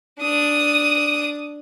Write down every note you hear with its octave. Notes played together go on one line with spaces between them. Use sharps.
D4 D#6